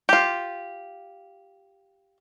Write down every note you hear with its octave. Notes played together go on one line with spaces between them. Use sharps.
F4 G4